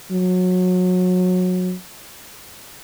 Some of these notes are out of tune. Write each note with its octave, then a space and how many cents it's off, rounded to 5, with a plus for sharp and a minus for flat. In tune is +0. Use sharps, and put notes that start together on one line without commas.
F#3 -25